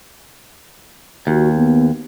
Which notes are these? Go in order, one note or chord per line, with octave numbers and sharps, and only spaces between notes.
D#2 F#4
B3